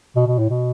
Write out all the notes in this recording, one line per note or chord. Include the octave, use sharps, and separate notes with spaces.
B2
B2
A2
B2